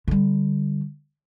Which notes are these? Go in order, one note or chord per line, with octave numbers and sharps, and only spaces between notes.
D3 G3